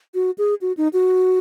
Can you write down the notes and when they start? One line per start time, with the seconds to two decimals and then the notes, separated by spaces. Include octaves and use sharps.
0.14 F#4
0.38 G#4
0.61 F#4
0.77 D#4
0.93 F#4